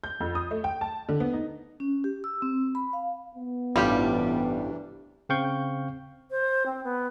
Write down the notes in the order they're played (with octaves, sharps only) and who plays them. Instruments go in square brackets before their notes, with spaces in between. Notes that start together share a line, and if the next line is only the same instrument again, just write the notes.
[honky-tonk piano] G6
F2
D#6
A3
G5
A5
D3
B3
D#4
[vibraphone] C#4
G4
E6
C4
B5
F5
[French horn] B3
[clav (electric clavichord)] A1 G2 [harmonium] C3 E3 D4 [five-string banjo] G3 F4 G4
[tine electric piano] C#3 C4 F5 G5 C#6 G6
[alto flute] C5
C4
B3